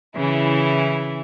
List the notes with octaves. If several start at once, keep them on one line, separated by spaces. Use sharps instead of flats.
C#3 E3 E4